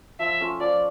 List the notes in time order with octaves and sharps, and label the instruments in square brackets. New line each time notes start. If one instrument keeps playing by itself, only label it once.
[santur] F3 [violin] E5
[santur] A3 C#4 F4
[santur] F3 [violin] D5